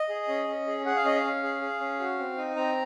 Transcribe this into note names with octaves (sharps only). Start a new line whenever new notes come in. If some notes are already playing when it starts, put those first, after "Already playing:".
Already playing: D#5
G#4
C#4
C#4
G#4
G#4 F#5
F5
C#4 D#5
F5
C#4
G#4
G#4
C#4
F#4
C4
D#4
C4 A#5